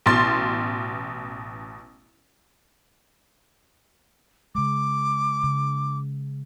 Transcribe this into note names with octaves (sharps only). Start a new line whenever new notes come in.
A1 B2 C6 A6
C#3 G#3 D6
C#3